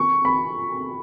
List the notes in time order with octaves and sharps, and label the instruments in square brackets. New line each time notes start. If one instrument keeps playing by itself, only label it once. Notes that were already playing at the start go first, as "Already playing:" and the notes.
Already playing: [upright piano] C#6
B5